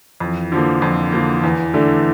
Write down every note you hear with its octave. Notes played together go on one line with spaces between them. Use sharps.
F2 E3
D3 F3 A#3
F2
D3 F3 A#3
E2 E3
D3 A3 D4